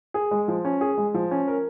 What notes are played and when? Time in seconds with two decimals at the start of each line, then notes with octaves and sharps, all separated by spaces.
0.14 G#4
0.31 G#3
0.48 F3
0.65 C#4
0.81 G#4
0.98 G#3
1.14 F3
1.31 C#4
1.48 A#4